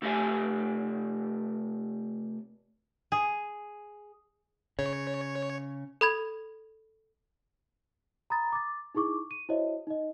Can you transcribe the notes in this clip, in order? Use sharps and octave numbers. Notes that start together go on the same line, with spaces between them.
C3 A3 G4 A#4 E5 G#5
G#4
C#3 C#5
A4 B5 G#6
A#5 B5 D#6 A6
D6 A6
D#4 E4 G#4 C#6 D6
D#7
E4 F#4 C5 C#5 D#5 E5
D#4 D#5